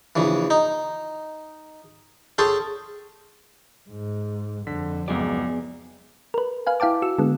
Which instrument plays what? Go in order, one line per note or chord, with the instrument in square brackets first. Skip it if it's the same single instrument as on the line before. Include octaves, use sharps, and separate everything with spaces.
[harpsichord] A#1 C#3 E3
D#4
C#4 G#4 A4 G5 C6
[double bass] G#2
[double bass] F2 [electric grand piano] D3 B6
[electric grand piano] C#2 G#2 F#3 [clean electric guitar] B3 G#4 D5
[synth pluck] A#4 B4
B4 F5 G#5
E4 F5 G5 A5 D6
F#4 E6
D3 G#3 B3